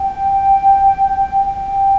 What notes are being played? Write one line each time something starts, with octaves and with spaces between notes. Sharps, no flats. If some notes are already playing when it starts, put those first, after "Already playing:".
Already playing: G5
G5